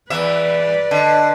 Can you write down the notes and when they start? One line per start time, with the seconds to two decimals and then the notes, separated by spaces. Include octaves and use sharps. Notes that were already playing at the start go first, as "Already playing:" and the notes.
0.10 E2 E3 B4 D5 E5
0.91 D3 D#5 A5